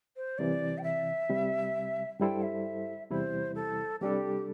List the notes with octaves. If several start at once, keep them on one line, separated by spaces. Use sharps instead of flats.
C5
C2 C3 E3 D5
G5
E5
C2 C3 G3
G2 G3 E4 A4 C5 G5
E5
E2 C3 G3 E4 C5
A4
C2 C3 G3 D4 G4 A4